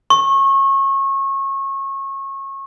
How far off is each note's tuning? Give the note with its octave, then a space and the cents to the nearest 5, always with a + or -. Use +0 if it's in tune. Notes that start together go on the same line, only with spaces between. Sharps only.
C#6 -25